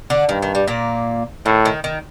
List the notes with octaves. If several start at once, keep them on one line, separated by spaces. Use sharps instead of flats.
D3 D4
G2 D#3
D#3
G3
A#2 A#3
A2 D#3
D#3
D#3